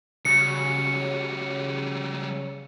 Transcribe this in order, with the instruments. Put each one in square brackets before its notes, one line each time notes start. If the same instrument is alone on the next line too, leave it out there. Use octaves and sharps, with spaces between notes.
[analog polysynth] C#3 [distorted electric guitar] F#3 G3 [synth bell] C#7